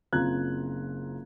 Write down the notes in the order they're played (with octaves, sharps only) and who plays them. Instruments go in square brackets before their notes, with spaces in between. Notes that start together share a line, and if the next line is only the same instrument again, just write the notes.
[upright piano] F#1 C4 F4 A#5 F#6 G#6